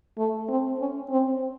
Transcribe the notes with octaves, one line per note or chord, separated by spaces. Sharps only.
A3
C4
C#4
C4